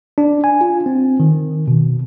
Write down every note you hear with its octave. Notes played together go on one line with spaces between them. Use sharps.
D4
G#5
F4
C4
D#3
B2